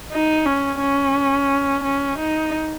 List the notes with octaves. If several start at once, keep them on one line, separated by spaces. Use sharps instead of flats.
D#4
C#4
C#4
C#4
D#4